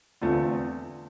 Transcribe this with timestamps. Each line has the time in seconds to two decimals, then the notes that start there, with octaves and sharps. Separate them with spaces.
0.21 E2 D3 A3 C4 F4